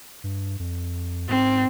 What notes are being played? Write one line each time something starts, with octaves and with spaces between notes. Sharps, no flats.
G2
F2
G#2 C4